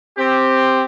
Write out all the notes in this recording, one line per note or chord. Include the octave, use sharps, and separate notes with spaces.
C4 G4